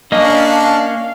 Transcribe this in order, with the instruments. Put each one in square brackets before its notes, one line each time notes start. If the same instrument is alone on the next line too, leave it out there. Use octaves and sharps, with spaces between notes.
[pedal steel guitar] A#3 C#4 [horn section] D4 [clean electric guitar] D#5 [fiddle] F5